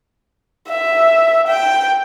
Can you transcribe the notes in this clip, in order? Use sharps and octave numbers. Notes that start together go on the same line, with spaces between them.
E5
G5